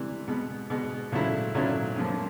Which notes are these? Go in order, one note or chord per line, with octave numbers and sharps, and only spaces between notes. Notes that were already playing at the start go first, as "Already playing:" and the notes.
Already playing: C3 E3 G3
B2 G#3 B3
B2 G#3 B3
A#2 F#3 A3 C#4 E4
A#2 F#3 A3 C#4 E4
F#2 C#3 F3 A#3